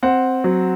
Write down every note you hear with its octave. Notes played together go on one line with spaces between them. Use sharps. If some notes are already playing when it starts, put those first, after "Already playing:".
C4 F#5
F#3